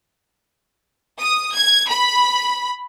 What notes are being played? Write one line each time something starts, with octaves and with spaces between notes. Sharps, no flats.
D#6
G#6
B5